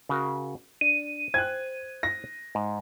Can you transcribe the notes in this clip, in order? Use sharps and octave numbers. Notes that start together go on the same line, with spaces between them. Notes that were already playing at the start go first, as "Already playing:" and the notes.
C#3 F#4 A#4
D4 D#7
C5 G5 G#5 F#6 G#6
A#6
G#2